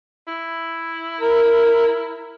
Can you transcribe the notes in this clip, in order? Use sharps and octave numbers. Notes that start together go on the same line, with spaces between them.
E4
A#4